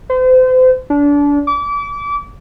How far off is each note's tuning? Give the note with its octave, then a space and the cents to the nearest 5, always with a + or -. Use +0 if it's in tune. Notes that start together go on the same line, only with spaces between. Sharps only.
C5 -35
D4 -30
D6 -30